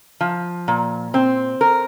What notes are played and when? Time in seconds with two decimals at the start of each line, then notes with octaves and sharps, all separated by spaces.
0.21 F3
0.68 A#2
1.14 C4
1.61 A#4